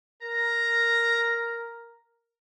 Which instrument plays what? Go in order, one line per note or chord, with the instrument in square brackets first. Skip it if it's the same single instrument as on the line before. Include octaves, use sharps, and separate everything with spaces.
[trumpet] A#4 [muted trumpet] A#5